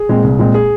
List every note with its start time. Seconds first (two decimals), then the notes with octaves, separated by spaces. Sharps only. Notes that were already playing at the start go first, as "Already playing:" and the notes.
Already playing: G#4
0.09 A#2 G#3 C4
0.24 C2
0.39 A#2 G#3 C4
0.54 G#4